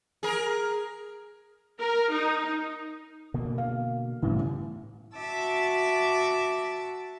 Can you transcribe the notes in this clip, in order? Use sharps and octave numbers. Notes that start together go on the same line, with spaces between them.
G#4 A#4
A#4
D#4
B2 D3 A#3
F5
A1 C#3 G3 B3
F#4 E5 A5 D6 E6